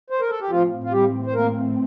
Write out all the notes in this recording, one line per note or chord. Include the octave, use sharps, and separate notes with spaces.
C5
A#4
A4
G4
A2 E3 F3 A3 C4 F4
F4
G3 G4
C5
A#3 A#4